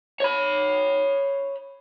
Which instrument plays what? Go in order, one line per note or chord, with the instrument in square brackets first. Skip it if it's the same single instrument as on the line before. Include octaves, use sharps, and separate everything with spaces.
[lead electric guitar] C#5 B5